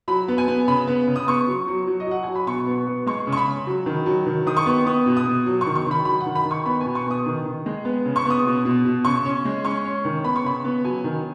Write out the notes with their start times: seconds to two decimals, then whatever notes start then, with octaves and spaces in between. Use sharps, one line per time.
0.08 F#3 B5
0.28 B3
0.38 G#5
0.48 B3
0.68 C#3 B5
0.87 B3
1.07 C#3
1.16 D#6
1.27 B3 C#6
1.47 F#3
1.68 F#3
1.87 F#3
2.00 D#5
2.07 F#3 F#5
2.23 F#3 G#5
2.36 B5
2.47 B2 C#6
2.67 B3
2.87 B3
3.06 G#3 C#6
3.27 C#3
3.32 C#6
3.37 B5
3.46 C#3
3.67 F#3
3.86 D#3
4.06 F#3
4.26 D#3
4.46 D#3 D#6
4.57 C#6
4.66 B3
4.86 B3 D#6
5.06 B2
5.17 D#6
5.27 B2
5.46 F#3
5.61 C#6
5.66 D#3
5.75 C#6
5.86 D#3 B5
6.05 F#3 B5
6.20 F#5
6.26 D#3
6.35 B5
6.45 D#3
6.51 C#6
6.66 B3 B5
6.81 G#5
6.86 B2
6.95 C#6
7.06 B3 D#6
7.26 D#3
7.45 D#3
7.66 G#3
7.85 B3
8.05 C#3
8.16 C#6
8.26 B3 D#6
8.45 B2
8.65 B2
8.85 B2
9.04 C#3 C#6
9.25 C#4
9.45 G#3
9.65 C#4 C#6
9.85 C#4
10.05 D#3
10.24 B3 B5
10.36 C#6
10.44 C#3 B5
10.64 B3
10.84 F#3 G#5
11.04 D#3